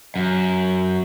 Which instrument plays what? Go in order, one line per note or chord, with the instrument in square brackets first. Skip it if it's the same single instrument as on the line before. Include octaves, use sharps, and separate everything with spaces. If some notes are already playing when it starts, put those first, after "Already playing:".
[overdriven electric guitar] F#2